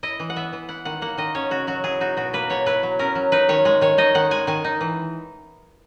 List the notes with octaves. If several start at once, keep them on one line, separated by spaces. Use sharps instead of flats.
E4 D#5
E3
F#5
B3 E5
E3
E4 F#5
D#3 F#5
A#3 F#5
D#3 D#5
C#4 C#5
C#3 F#4
F#3 F#4
E4 G#4
D#4 F#4
B2 F#4
A#3 B4
B2 C#5
E4 B4
F#3
C#4 A#4
F#3
D#4 B4
D#3 C#5
G#3
D#3 C#5
D#4 D#5
D#3 F#5
G#3 G#5
D#3 G#5
D#4
E3